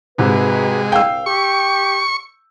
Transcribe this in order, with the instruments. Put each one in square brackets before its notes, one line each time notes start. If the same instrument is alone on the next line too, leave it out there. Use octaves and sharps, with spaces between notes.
[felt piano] G#2 C3 [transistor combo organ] G#3 [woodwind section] F#4 G4 B4
[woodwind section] C2 F5 [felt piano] G5 E6
[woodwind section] G4 [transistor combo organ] C#6